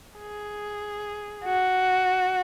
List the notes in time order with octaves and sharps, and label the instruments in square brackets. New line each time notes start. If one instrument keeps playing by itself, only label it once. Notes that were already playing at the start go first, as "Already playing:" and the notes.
[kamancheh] G#4
F#4